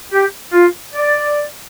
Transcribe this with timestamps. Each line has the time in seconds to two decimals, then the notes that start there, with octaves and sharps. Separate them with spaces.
0.12 G4
0.53 F4
0.94 D5